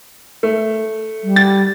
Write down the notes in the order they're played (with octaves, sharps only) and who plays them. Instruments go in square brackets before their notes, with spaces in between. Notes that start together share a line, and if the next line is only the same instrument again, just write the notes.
[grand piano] A3
[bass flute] G3
[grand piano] A6